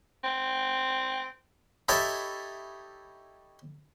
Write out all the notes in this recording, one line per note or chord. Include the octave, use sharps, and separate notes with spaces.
C4
D#4 E4 G4 A4 C#5 E5